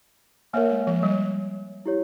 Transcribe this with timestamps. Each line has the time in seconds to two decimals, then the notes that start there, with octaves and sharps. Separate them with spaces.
0.53 A#3 A#4 C#5 E5 G#5
0.71 G#3
0.87 F3
1.03 G3
1.86 E4 G4 C#5